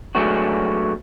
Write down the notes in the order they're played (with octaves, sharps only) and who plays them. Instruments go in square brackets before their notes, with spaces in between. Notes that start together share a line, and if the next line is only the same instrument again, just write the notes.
[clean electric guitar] F#3 G#3 A3 B3 D4 F#4